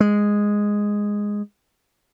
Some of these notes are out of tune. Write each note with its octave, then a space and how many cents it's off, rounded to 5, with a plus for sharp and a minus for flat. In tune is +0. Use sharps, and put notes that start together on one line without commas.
G#3 -5